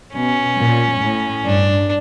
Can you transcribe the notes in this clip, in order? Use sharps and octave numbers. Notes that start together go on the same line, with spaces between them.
B2 C#4
A#2
A2
G2 D4